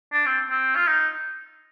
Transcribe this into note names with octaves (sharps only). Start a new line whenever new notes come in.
D4
C4
C4
F4
D#4